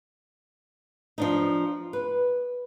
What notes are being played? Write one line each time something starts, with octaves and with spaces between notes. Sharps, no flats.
F3 D4 D#4
B4